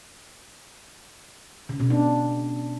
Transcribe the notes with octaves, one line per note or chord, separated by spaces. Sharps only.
C#3
B2
D4